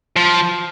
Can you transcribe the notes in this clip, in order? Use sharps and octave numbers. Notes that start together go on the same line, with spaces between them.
F3